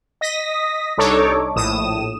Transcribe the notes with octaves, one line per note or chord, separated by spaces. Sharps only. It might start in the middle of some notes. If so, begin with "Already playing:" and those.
D#5 D#6 A#6 B6
C2 D4 D#4 A4 C#5 D6
A#1 A2 D#6 E7